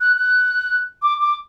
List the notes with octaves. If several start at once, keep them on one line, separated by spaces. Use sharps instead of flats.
F#6
F#6
D6
D6